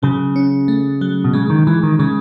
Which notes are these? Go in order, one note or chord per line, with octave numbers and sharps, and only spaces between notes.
C#3 F#3
C#4
A3
F#3
B2
C#3 G#3
D#3
E3 G#3
D#3
C#3 G#3